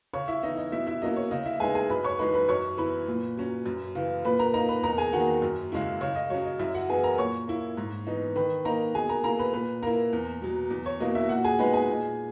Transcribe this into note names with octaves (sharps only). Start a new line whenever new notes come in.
C#3 C#5 C#6
E4 E5
E3 B3 D#4 D#5
D#5
B2 E4 E5
E4 E5
F#3 A#3 C#4 E4 D#5
C#5
C#3 D#5
E4 E5
G#3 B3 D#4 G#4 G#5
G#4 G#5
F#2 B4 B5
C#5 C#6
E3 G#3 D#4 B4 B5
B4 B5
F#2 C#5 C#6
E3 B3 E4 B4 B5
A#2
F#3 C#4
F#2
C#3 E3
A#2 B4 B5
A#4 A#5
A#3 D#4 A#4 A#5
B4 B5
E2 A#4 A#5
G#4 G#5
D#3 A#3 F#4 F#5
F#2
C#3 G#3 C#4 E4
C#3 C#5
D#5
F#3 C#4 C#5
D#5
F#2 E4 E5
F#4 F#5
E3 B3 E4 G#4 G#5
A#4 A#5
A#2 C#5 C#6
A#3 E4
G#2
E3 B3 D#4
D#3 B4 B5
A#3 D#4 A#4 A#5
B2 G#4 G#5
A#4 A#5
A#3 E4 A#4 A#5
B4 B5
A#2 B4 B5
A#3 E4 A#4 A#5
E2
B2 F#3
E2
C#5
B2 F#3 A#3 E4 D#5
E4 E5
A#2 F#4 F#5
G#4 G#5
G#3 B3 D#4 B4 B5
G#4 G#5
A#2